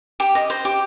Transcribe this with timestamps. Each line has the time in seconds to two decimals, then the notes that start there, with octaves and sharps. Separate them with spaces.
0.20 G4
0.35 D#5
0.50 C5
0.65 G4